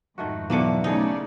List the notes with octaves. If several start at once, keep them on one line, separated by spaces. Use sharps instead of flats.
F2 G#2 D#3 A3 F#4
B1 D3 E3 A3 A#3 G#5 D6 C#7
C#3 A3 D#4 G#4 A4 D5 D#5